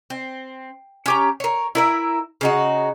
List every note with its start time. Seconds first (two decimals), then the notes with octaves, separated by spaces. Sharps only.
0.10 C4
1.06 C#4 G4 A#5
1.40 A#4 C#5
1.75 E4 A#4 E5
2.41 C#3 D#4 F#4